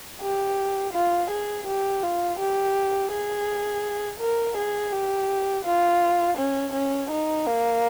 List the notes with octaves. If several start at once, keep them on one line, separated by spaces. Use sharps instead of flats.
G4
F4
G#4
G4
F4
G4
G#4
A#4
G#4
G4
F4
C#4
C#4
D#4
A#3